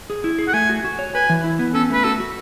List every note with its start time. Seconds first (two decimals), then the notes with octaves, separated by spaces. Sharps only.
0.10 G#4
0.24 E4
0.39 G#4
0.48 F#5
0.54 A3 G#5
0.69 F#4
0.84 F#4
0.99 C#5
1.15 B4 G#5
1.30 E3
1.44 E4
1.59 B3
1.74 C#4 A4
1.90 A3 B4
2.04 F#4 A4
2.20 F#4